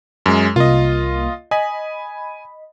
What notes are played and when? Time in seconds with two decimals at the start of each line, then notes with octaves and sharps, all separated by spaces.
0.26 F#2 G#3
0.56 C2 A#3 F4 D#5
1.51 D#5 G#5 B5